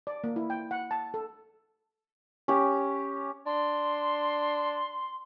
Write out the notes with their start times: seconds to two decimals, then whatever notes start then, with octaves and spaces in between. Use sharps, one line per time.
0.07 D5
0.24 A#3
0.36 E4
0.50 G5
0.71 F#5
0.91 A5
1.14 A4
2.48 C#4 G4
3.46 D4 C6